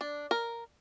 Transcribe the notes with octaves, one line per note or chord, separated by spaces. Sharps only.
D4
A#4